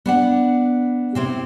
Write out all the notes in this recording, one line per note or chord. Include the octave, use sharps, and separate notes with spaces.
B3 D4 F#5
C3 C4 E4